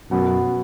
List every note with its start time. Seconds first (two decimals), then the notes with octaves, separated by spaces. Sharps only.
0.11 F#2 B2 F#3 B3